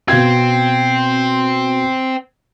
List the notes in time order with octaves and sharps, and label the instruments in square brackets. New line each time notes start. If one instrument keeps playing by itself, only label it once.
[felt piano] B2 F5 G#6 [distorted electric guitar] C4